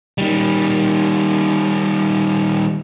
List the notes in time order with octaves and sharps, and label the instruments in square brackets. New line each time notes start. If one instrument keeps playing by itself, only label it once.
[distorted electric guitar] D#3 G3